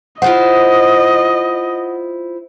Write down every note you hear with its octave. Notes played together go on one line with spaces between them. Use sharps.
E4 F4 C5 D#5 F#5